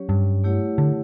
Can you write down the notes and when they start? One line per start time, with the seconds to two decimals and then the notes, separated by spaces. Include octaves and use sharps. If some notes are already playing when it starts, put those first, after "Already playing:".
Already playing: F#3 C#4 G4 C#5
0.09 G2
0.44 A3 E4 G4 C#5 F#5
0.78 D3